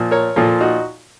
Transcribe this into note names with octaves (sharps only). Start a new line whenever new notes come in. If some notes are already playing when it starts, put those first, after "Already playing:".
Already playing: A#2 F3
A#4 C#5
A#2 F3 F4 A4
D#4 F#4